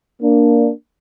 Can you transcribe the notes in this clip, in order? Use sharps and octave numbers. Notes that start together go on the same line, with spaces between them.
A#3 D4